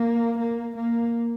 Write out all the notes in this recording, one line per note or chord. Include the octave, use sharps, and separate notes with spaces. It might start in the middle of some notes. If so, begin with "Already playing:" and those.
Already playing: A#3
A#3
A#3